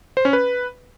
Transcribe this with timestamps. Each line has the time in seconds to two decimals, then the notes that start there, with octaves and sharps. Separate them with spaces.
0.17 C5
0.25 C#4
0.33 B4